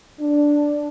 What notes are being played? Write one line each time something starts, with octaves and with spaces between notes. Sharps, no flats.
D4